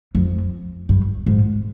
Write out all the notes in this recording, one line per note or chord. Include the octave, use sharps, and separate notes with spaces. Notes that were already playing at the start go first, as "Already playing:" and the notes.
F2
G2
G#2